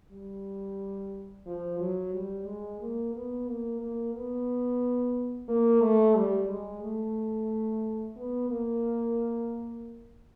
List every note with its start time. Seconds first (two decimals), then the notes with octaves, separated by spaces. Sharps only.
0.12 G3
1.46 F3
1.80 F#3
2.14 G3
2.46 G#3
2.80 A#3
3.14 B3
3.47 A#3
3.80 A#3
4.15 B3
5.48 A#3
5.81 A3
6.15 G3
6.49 G#3
6.82 A3
8.16 B3
8.49 A#3